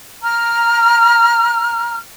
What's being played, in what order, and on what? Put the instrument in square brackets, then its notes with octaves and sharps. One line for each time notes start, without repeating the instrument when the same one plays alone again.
[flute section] A#5 F6